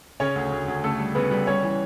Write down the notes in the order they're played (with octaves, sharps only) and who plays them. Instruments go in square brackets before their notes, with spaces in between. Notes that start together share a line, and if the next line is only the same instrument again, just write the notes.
[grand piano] C#3 C#4 C#5
D2
D2
D2
C#3 A3 A4
G3
C#3 B3 B4
G3
G3 C#4 C#5
E3